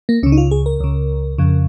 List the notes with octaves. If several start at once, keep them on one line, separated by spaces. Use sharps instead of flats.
A#3
C#2 C#3 C#4
D#4
F4
G#4
A#4
C#2 C#3
F2 C#3